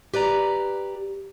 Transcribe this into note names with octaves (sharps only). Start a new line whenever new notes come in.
G4 B4 D5 A#5